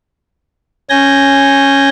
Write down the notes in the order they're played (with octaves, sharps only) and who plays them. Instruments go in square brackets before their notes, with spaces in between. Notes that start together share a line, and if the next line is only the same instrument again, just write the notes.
[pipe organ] C#4 G#5 G6 A#6